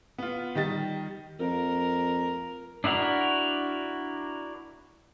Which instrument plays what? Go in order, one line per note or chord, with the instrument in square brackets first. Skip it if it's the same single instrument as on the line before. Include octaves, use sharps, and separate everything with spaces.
[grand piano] B3 F4
D#3 G3 D#5 A6
[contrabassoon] F2 [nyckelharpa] A#4
[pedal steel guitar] D4 E4 F#4 A#4